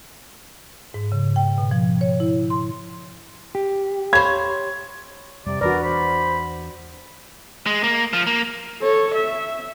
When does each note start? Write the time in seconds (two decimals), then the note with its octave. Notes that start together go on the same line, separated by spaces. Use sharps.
0.94 G#2
1.12 C#3
1.36 G5
1.58 B2
1.71 F3
2.01 C#5
2.20 E4
2.50 C6
3.55 G4
4.13 C5 C#5 F5 B5 C#6 G#6
5.46 F2 C3 G3 D5
5.61 E2 E3 D4 F#4 A#4 B4 D5
5.83 C5 B5
7.66 G#3
7.84 A#3
8.13 F3
8.27 A#3
8.82 A4 C#5
9.14 E5